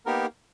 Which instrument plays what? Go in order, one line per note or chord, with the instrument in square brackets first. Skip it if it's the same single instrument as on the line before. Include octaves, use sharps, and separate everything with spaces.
[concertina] A#3 B3 D#4 G4 A#4